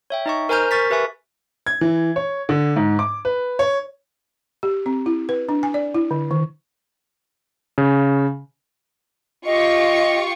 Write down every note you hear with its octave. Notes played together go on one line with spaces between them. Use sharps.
C#5 E5 G5
D#4 D#5 C#6
A#4 C5 G#5 A#5 F6 G6
A#4 C#6 A6 B6
G4 B4 E5 G#5 C#6
G#6
E3
C#5
D3
G#2
D6
B4
C#5
G4
C4
E4
B4
D4
G#5
D5
E4
D3
D#3
C#3
F4 G4 D#5 C#6